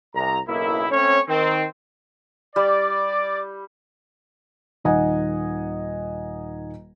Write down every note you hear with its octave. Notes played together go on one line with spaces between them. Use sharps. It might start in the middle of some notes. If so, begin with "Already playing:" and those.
C2 A#5
F#1 B1 A#3 D#4 E4
A3 C4 C#4 C#5
D#3 C4
G3 D5
D#1 D#3 D#5 F#5 G#5